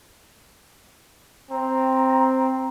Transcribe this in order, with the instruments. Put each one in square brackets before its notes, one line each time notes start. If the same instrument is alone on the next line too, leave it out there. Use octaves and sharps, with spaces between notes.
[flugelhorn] C4 [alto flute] A#5